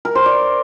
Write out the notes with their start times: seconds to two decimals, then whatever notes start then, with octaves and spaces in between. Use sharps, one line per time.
0.05 A#4
0.15 C5
0.26 D5